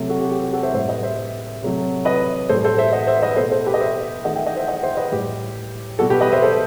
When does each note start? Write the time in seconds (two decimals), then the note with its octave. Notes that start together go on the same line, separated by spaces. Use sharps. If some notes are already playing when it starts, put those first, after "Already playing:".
Already playing: C3 F#3 A3
0.09 F#4 A4
0.20 G4
0.31 G4
0.42 F#4
0.53 F#4 A4
0.63 C5 E5
0.74 A2 G3 C5 E5
0.89 B4 D#5
1.03 C5 E5
1.62 C3 F#3 A3
2.05 B4 D#5
2.49 A2 G3 A4 C5
2.64 A4 C5
2.78 C5 E5
2.93 D#5 F#5
3.07 C5 E5
3.23 B4 D#5
3.36 B2 A3 A4 C5
3.51 A4 C5
3.66 G4 B4
3.74 D#5
3.80 C5 E5
4.24 D#3 A3 D#5 F#5
4.35 E5 G5
4.46 D#5 F#5
4.57 C5 E5
4.68 D#5 F#5
4.83 C5 E5
4.97 B4 D#5
5.12 A2 G3 G4
5.99 B2 G3 F#4 A4
6.10 G4 B4
6.21 B4 D#5
6.32 C5 E5
6.42 A4 C5